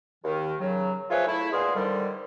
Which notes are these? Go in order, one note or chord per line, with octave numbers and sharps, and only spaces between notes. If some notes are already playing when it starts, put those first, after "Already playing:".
D#2 D#3
C#3 F#3
F3 F4 G#4 B4 C#5 E5
A3 E4
A#2 G#3 B3 G#4 F5 C6
G#2 D3 D#3 G3